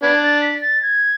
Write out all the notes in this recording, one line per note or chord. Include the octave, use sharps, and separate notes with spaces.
B3 D4 G#6
A6
B6
A6
G#6